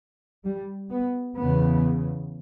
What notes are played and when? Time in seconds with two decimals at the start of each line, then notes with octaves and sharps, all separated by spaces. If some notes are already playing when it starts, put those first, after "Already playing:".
0.44 G3
0.91 B3
1.37 E2 C#3 B3